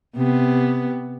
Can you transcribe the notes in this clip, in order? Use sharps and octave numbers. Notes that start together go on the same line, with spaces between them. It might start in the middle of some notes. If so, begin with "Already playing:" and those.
C3 B3